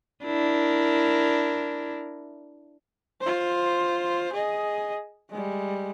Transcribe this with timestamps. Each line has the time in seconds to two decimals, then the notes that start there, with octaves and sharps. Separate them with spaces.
0.24 D4 E4 A#4
3.22 F4 C5
4.33 G#4 D#5
5.30 G3 G#3